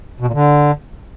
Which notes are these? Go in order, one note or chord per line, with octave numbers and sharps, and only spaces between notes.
B2
A#2
D3